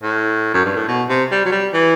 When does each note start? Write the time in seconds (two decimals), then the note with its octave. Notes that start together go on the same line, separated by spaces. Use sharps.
0.03 A2
0.54 F#2
0.65 G2
0.76 A2
0.88 B2
1.09 C3
1.32 G3
1.45 F#3
1.52 G3
1.73 E3